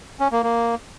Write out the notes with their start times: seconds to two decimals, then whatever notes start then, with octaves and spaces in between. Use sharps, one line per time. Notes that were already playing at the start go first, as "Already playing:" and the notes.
0.20 C#4
0.32 A#3
0.43 A#3